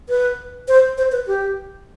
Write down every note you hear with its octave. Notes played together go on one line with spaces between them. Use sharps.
B4
C5
C5
B4
G4